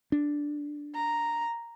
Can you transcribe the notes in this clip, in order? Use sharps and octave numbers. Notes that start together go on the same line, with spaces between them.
D4
A#5